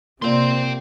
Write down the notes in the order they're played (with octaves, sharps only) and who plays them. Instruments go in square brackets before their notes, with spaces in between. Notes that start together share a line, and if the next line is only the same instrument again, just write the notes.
[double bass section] C3 [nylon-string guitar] A#3 F4 D5 [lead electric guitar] G5 C6